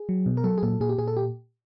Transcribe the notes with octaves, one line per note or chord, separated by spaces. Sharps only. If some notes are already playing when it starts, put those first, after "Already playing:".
Already playing: G#4
F#3
B2
A#4
F#3 A4
G#4
A#2 A4
A#2 G#4
G4
A#2 G#4
A4
G4